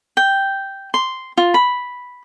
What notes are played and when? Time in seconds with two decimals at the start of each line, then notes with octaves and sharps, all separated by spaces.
0.17 G5
0.94 C6
1.37 F4
1.54 B5